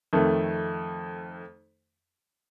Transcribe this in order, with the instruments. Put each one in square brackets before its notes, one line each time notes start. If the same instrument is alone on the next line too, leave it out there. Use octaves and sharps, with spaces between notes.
[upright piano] F2 D#3 A3